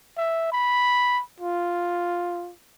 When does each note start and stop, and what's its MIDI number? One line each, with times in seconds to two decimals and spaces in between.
0.17 0.51 76
0.52 1.22 83
1.40 2.52 65